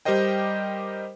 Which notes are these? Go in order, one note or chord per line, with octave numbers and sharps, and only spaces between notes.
G3 G4 A#4 C5 D#5 G5